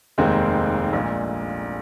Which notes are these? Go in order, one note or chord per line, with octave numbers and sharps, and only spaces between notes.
F1 D#2 D#3 G#3 C4
A#1 A#2 G#3